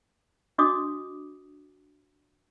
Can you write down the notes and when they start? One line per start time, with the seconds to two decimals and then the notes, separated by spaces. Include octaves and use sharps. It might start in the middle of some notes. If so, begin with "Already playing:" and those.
0.58 D4 F#4 D#5 D6 D#6